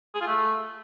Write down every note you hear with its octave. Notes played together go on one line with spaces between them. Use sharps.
G#4
F4
A3